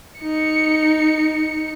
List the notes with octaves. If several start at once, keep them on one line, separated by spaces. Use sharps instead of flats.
D#4 C#7